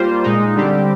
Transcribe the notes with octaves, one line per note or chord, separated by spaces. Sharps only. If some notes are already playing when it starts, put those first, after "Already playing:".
Already playing: G3 A#3 F4 C5
A#2 G#3 D#4
D3 G3 C4 G4